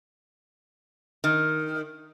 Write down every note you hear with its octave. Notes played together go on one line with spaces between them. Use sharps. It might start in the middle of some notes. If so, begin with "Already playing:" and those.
D#3